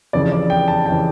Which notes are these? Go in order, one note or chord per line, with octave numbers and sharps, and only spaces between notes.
F1 F2 C#3 E3 D5
D5
G5
A5
F1 C#3 E3 G5